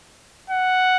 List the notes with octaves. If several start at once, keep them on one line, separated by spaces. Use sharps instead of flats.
F#5